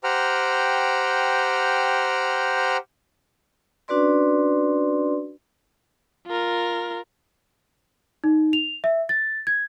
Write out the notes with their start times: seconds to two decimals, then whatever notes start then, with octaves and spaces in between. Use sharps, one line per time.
0.04 G4 C5 F#5 G5 A#5 F6
3.88 C#4 D4 F#4 B4 D5 C6
6.27 F4 A#4
8.24 D#4
8.53 F7
8.84 E5
9.09 A6
9.47 G#6